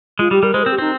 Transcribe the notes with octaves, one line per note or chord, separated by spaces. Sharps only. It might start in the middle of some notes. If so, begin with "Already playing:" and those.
G#3 F4
G3 G4
G3 A#4
G#3 C5
C4 A#4
G4
C4 D#4